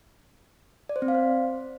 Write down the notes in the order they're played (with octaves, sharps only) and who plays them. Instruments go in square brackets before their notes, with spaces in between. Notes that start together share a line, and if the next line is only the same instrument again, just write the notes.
[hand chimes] D5
C5
C4
F5
C5